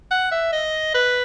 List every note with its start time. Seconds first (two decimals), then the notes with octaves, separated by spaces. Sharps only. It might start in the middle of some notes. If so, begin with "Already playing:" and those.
0.11 F#5
0.31 E5
0.52 D#5
0.94 B4